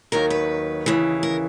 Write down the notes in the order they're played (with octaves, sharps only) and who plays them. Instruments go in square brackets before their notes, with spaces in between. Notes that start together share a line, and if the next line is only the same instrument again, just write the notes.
[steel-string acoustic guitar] D#2 D#3 F#3 A#4
B4
D#2 C#3 E3
A#4